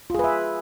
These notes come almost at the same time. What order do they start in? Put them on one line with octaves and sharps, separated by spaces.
F4 G#4 B4 E5